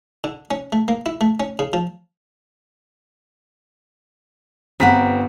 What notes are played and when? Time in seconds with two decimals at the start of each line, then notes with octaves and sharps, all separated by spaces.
0.24 D3
0.51 C#4
0.72 A3
0.88 A#3
1.06 E4
1.21 A3
1.40 C#4
1.59 C#3
1.73 F3
4.80 G1 C4 B4 F#5 A#5 B6